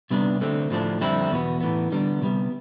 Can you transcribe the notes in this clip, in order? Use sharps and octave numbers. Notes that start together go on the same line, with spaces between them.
C3 G3 B3 D4
D3 A3 C4
A2 F3 A3 D4
F2 D3 G3 C4 E4
E2 B2 B3
A2 E3 B3
D3 G3 B3 D4
C3 G3 B3